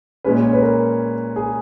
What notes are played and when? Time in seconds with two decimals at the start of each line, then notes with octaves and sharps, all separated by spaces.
0.24 A#2 G#3 C#4 B4
0.43 C#5
0.53 B4
0.62 A#4
1.36 G#4